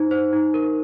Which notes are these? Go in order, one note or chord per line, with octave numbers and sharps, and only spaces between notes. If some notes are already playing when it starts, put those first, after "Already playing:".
Already playing: D#4 C5
C5
D#4
A#4